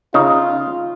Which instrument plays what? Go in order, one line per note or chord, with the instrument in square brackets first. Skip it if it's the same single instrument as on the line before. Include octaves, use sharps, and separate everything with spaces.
[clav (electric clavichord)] C#3 D#4 [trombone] F4